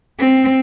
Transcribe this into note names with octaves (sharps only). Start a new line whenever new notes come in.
C4